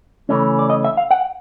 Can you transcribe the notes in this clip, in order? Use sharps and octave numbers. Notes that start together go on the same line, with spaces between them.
C#3 E3 A3 C#4
D5
D#5
E5
F5
F#5